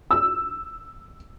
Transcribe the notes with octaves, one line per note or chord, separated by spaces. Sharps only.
E6